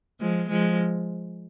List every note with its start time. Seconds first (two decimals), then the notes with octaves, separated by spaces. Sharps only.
0.20 F3 G#3
0.49 F3 G#3